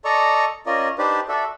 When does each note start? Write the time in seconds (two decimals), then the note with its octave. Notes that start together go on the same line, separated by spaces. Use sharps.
0.05 A4 D5 D#5 A#5 C#6
0.66 C#4 F4 A#4 D5 D#5
0.98 D4 D#4 G4 B4 C5 D5
1.28 F#4 A4 D5 E5